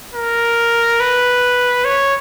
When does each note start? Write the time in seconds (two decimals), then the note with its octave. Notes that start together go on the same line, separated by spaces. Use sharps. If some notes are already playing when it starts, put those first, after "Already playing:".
0.14 A#4
1.00 B4
1.84 C#5